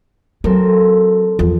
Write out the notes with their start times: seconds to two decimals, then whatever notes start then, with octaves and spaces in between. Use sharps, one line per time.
0.44 F#3 C4 A4 A#4
1.39 E2 F3